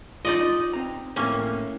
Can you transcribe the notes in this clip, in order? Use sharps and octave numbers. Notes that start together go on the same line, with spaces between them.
D#4 F4 D5 D#5
C4 A#5
A2 A#3 C4 C#4